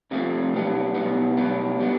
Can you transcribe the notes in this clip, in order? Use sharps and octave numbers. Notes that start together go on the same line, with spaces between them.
C2 C3 F3 A3 C4
B1 B2 G3 B3 D4
B1 B2 G3 B3 D4
B1 B2 G3 B3 D4
B2 G3 B3 D4